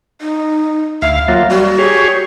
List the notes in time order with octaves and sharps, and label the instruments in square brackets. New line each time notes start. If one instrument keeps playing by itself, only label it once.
[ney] D#4
[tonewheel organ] D2 F5 [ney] E5
[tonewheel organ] F#3 A#3 F4
[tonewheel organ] G3 [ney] F#4
[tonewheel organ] G4 G#4 C#5